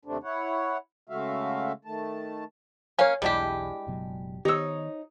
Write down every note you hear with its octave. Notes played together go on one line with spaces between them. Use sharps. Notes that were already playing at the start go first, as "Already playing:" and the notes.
D#2 C3 A3 C4 D4
E4 C#5 F#5
C#3 G#3 A3 F#4 E5 F5
D#3 A3 A5
A#3 C#4 C#5 F5 G#5
B1 E2 G3 G#3 D4 E4 G4
F#1 B2 F#3
D#3 B3 D#4 G4 C#5 E6